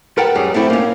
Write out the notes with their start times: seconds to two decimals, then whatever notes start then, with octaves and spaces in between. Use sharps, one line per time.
0.18 A#4 B4 F#5 G5 A5
0.35 F#2 G3 G#4
0.54 A3 C4 E4 F4 G4
0.70 A#3 C#4